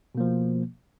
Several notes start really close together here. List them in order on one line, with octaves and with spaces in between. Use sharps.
B2 A#3 F3